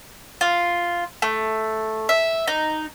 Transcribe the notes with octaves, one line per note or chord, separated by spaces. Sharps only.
F4
A3
E5
D#4